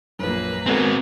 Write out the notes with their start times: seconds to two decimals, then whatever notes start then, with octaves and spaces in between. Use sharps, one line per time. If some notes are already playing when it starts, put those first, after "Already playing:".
0.19 A#1 F#2 A#3 B4
0.66 G#3 B3 C4 F#4 A#4